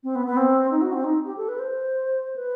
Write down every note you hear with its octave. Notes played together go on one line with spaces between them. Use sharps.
C4
B3
B3
C4
D#4
F#4
C4
D#4
G4
A4
B4
C5
B4